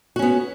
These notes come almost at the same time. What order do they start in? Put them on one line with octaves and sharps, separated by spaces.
F#4 C#4 B3